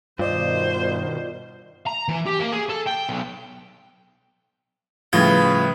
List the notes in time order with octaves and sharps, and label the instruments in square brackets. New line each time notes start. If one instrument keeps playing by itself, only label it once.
[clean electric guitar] G2 [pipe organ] B2 D#3 [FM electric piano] F4 D5 D#5 [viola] C5
[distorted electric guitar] A#5
E3
G4
A#3
G#4
A4
G5
B1
[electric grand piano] A2 C#3 G#6 [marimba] F3 G3 [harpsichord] F4 [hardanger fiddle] B4